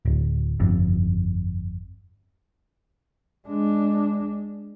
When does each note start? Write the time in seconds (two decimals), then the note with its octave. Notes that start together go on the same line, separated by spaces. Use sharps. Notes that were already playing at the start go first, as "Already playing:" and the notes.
0.05 D1
0.60 G1 F2
3.48 G#3 D4